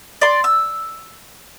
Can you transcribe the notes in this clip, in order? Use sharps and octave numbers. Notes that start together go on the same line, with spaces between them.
D5 C6
E6